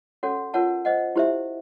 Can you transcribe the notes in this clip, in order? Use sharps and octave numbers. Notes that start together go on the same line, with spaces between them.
C#4 F#4 A4 C#5 F#5
F4 A#4 C#5 F#5 A5
C5 D#5 F#5
E4 G4 C5 E5